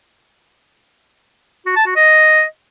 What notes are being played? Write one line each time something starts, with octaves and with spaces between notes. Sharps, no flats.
F#4
A5
F#4
D#5